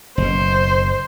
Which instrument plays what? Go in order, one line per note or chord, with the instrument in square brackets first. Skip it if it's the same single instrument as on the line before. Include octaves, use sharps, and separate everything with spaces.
[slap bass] F#1 B2 [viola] C5